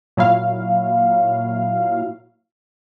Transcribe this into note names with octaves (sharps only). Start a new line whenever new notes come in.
A#2 F#3 E4 F5